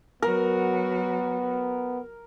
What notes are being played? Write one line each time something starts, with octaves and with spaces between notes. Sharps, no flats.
F#3 B3 F#4 A#4